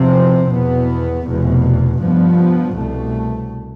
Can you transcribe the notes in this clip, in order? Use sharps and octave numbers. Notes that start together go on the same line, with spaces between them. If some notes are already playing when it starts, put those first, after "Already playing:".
Already playing: E2 C3 F3 C4
E2 B2 B3
F1 E2 B2
G2 F3 B3
C2 B2 A3